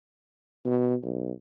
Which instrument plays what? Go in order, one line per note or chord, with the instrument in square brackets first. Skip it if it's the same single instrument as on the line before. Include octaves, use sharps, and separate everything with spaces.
[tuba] B2
B1